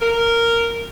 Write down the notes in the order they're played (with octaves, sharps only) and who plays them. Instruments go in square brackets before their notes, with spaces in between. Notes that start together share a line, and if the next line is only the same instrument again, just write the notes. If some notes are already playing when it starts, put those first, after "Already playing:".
[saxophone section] A#4